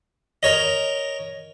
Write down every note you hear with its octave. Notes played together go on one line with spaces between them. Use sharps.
A#4 C#5 D#5